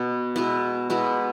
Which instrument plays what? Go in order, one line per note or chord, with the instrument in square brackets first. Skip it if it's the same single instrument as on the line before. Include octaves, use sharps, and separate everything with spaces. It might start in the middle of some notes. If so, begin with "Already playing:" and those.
Already playing: [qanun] B2 B3
B2 G#3 B3 E4
B2 G#3 B3 E4